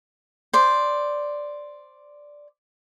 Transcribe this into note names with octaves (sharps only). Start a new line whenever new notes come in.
C5 D5